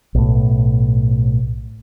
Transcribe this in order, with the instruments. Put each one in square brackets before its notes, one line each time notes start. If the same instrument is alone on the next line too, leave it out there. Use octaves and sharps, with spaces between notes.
[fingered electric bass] B1 A2